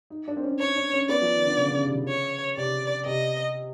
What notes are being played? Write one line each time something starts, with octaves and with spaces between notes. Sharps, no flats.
D#4
D4
C4
C#4
D4 C#5
D4
C#4
B3 D5
F3
D#3
D3
C#3
C#3
C3
C#3
C#5
C3 D5
C3 D#5